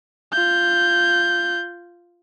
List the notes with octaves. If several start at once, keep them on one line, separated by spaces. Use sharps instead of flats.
F4 G6